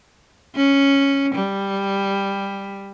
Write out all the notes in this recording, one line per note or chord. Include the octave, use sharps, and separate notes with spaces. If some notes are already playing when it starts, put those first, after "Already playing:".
C#4
G3